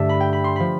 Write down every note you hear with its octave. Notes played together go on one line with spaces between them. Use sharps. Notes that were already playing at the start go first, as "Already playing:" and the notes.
Already playing: G2 D3 A3 D5 E5
B5
G5
B5
C6
F3 B5